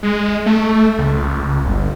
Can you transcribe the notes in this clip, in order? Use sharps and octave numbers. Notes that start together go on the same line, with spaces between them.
G#3
A3
C#2
G1